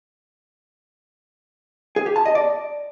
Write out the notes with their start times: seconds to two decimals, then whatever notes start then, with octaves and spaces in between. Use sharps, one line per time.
1.96 G#4
2.06 G4
2.16 A5
2.25 D#5
2.35 D5